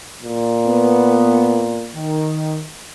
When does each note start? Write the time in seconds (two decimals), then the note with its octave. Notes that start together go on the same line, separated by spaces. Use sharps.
0.23 A#2
0.67 B3
1.95 D#3